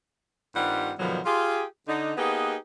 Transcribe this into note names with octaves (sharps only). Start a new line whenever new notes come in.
G2 D#3 G3 C4 F4 F#5
G2 B2 D3 D#3 F3 F#3
F4 G4 G#4
D3 D#4
A#3 B3 D#4 G4 G#4 B4